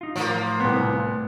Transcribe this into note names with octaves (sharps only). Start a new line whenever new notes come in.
D#4 F4
A2 F3 A#3
C2 B3